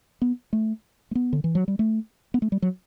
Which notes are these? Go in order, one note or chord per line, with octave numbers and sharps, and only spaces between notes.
B3
A3
A3
B3
D3
E3
F#3
G3
A3
B3
A3
G3
F#3